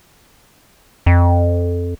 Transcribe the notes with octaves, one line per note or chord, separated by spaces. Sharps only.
F2